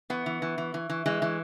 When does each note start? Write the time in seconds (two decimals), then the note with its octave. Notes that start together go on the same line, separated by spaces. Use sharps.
0.10 E3 B3
0.26 E3
0.42 E3
0.58 E3
0.74 E3
0.90 E3
1.06 E3 G#3
1.22 E3